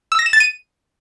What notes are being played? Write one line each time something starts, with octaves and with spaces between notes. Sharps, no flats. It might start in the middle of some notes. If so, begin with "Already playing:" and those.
E6
A#6
E7
A6
D#7